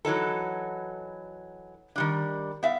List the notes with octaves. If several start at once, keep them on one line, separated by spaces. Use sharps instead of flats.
E3 F#3 D#4 A4
D#3 G3 D4
B3 E5 F5